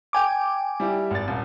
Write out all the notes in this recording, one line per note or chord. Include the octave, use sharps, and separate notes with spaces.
G5 G#5 D6
G3 E4 G4
G#1 A6
D#1